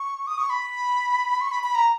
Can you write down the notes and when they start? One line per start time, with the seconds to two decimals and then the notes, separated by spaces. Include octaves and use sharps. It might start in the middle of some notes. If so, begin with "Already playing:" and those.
Already playing: C#6
0.27 D#6
0.38 C#6
0.50 B5
1.41 C#6
1.51 B5
1.64 B5
1.75 A#5